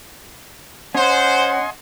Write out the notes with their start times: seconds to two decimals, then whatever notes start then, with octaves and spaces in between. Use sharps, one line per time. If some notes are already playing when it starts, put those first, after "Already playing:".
0.95 C#4 C5 D#5 F#5 G#5 C6